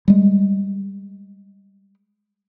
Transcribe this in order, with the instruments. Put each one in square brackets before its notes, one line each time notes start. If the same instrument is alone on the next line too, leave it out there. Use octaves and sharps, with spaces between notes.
[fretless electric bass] G3 G#3